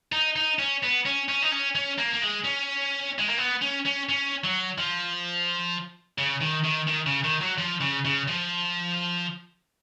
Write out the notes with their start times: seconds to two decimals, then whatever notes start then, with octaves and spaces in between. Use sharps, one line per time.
0.12 D#4
0.36 D#4
0.59 C#4
0.83 B3
1.05 C#4
1.29 C#4
1.42 D#4
1.52 C#4
1.75 C#4
1.98 A#3
2.14 A#3
2.22 G#3
2.45 C#4
3.19 G#3
3.29 A#3
3.38 B3
3.62 C#4
3.86 C#4
4.09 C#4
4.44 F#3
4.78 F3
6.18 C#3
6.42 D#3
6.65 D#3
6.88 D#3
7.06 C#3
7.24 D#3
7.41 F#3
7.58 F3
7.81 C#3
8.05 C#3
8.28 F3